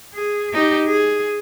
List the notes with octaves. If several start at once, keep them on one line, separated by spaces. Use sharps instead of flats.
G#4
D#4 G4
G#4